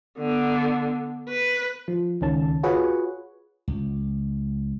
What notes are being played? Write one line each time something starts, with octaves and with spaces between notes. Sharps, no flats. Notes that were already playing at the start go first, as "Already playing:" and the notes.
D3 B3
B4
F3
C#2 D#3 C#4 A5
F4 F#4 G#4 B4 C#5 F#5
C#2